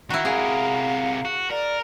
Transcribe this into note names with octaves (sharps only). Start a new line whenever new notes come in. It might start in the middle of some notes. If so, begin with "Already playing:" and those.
D#3 E4 F#4
C3 G#4 A#4 F5
F#4
A#4 D5